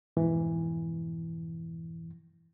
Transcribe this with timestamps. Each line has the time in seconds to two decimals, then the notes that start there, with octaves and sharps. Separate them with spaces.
0.17 F2 G#2 B2 E3